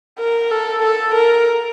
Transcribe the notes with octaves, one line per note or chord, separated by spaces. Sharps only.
A#4
A4
A4
A#4